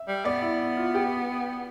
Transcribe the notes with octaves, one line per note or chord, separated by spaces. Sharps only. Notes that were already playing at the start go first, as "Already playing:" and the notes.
Already playing: E5
G3
B3 D5
E4
F4
G4